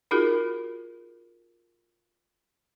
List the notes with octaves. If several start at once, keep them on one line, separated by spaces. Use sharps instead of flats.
D#4 F4 F#4 G#4 A#4